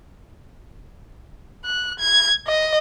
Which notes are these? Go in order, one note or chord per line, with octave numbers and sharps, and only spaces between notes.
F#6
G#6
D#5